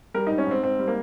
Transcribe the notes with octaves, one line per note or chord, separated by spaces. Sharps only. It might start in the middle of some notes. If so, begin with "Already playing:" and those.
G3 A#4
G#2 D#4
C#4
G#2 C4
G#2 C4
G3
A#3